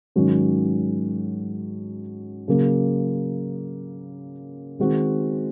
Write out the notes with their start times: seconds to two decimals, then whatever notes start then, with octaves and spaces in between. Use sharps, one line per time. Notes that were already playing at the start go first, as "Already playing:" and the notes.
0.16 G#2 D#3 F#3 C#4 F#4
2.48 C#3 F#3 A#3
4.79 D#3 G#3 C4 F#4